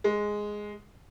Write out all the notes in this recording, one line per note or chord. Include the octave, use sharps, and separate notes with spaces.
G#3